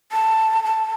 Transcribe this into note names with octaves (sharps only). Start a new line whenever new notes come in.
A5
A5